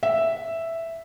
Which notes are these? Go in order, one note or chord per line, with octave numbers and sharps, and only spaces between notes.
E5